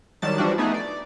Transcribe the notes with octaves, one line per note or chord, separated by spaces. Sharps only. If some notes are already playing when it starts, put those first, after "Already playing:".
D#3 F#3 G3 A5 A6
E3 F3 G3 D4 F#4
A3 B3 D#4 G#4
D5